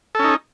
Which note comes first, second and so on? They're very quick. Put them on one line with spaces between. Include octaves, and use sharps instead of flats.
A4 C#4 D#4